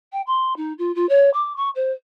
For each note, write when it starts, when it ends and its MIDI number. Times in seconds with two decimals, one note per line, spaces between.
0.12 0.21 79
0.27 0.56 84
0.56 0.73 63
0.78 0.94 65
0.95 1.08 65
1.09 1.30 73
1.33 1.55 86
1.56 1.69 85
1.75 1.91 72